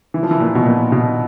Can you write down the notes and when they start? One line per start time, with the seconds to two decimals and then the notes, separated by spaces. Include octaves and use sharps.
0.14 E3
0.23 F3
0.31 E3
0.40 A#2
0.55 B2
0.65 A#2
0.92 B2